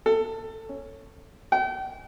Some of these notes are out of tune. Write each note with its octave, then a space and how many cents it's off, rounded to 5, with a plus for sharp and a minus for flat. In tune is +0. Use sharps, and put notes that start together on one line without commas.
A4 +20
C#4 +5
G5 -40